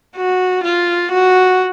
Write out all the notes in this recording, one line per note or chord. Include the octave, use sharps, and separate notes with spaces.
F#4
F4
F#4